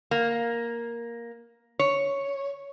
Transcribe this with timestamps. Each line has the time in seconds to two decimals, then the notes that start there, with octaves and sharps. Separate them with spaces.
0.11 A#3
1.79 C#5